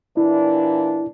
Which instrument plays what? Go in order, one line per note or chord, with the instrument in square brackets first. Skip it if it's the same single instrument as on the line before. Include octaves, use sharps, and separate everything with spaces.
[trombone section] A#2 E3 D4 [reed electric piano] E4